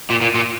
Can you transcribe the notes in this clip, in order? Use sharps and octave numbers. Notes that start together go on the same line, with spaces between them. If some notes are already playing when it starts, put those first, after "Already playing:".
A#2
A#2
A#2